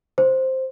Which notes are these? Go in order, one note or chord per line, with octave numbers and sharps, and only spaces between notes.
C5